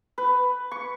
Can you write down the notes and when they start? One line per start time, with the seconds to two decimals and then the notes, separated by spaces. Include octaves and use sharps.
0.18 B4
0.71 C#6